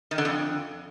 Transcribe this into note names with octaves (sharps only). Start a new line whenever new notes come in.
D#3
D3
F2